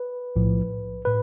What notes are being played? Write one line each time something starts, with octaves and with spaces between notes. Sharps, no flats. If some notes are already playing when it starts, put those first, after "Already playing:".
Already playing: B4
B1 A2 F3
A2 B4